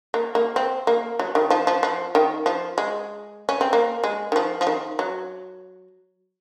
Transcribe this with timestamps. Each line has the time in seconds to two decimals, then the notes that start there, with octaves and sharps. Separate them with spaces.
0.14 A#3
0.35 A#3
0.56 C4
0.87 A#3
1.19 F#3
1.35 D#3
1.50 F3
1.67 F3
1.83 F3
2.15 D#3
2.46 F3
2.78 G#3
3.49 C#4
3.61 C4
3.73 A#3
4.04 G#3
4.32 D#3
4.36 F3
4.61 F3
4.67 D#3
4.99 F#3